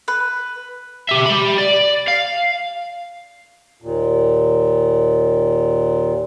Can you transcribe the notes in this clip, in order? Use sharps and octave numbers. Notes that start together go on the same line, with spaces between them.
B4
G4 E5
G4 B5
D5
F5
D#2 A#2